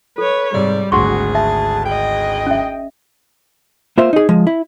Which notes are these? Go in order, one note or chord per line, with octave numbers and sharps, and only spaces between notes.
A4 B4 C#5
G#2 C3 G3 D5
G#1 D2 F#4 G#4 F#5 C6 C#6
E5 A5
G#4 D#5 G5
C#4 E5
A#3 F4 C5 E5
D#4 G#4
F3 G#3
E4